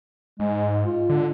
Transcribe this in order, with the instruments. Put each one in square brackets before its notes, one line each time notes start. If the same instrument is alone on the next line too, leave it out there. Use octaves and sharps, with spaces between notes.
[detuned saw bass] G#2 [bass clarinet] G#3
[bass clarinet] F4
[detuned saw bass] D3